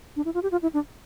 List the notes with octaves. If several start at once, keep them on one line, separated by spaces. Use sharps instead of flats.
D4
E4
F4
G4
F4
E4
D4